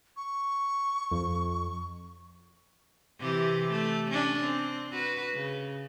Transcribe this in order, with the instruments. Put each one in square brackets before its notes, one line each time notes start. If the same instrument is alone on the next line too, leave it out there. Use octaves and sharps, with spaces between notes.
[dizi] C#6
[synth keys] F2
[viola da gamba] C3 E3 G4
A3
C#4 D4
C4
F#4 B4
C#3